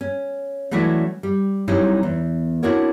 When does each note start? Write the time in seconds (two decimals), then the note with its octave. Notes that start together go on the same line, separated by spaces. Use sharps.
0.01 C#4
0.71 E3 F#3 A3 C#4 E4 D5
1.23 G3
1.68 F#3 G3 C4 C#4 D#4 E4
2.03 E2
2.63 C4 D4 E4 F#4 A#4 C#5